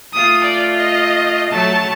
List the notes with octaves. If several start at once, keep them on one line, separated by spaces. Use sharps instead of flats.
A3 F4 D#6
D5
D#5
F#3 A3 A5